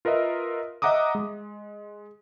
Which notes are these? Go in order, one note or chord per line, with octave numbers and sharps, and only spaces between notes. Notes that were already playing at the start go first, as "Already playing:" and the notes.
F4 A#4 B4 D#5 E5
D#5 E5 F#5 A#5 D6 D#6
G#3